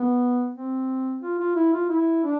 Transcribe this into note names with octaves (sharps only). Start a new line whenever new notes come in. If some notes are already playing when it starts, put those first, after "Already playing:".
Already playing: B3
C4
F4
F4
E4
F4
E4
D4